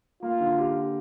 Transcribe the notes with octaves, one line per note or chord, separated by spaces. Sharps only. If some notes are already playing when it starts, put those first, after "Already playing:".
A#3 F4
D3
G4